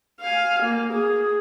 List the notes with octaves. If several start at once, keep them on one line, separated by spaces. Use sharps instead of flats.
F5 G#5
A#3
G#4